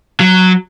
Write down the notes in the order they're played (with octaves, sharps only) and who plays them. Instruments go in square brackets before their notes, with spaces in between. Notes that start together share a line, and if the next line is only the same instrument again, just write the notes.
[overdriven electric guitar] F#3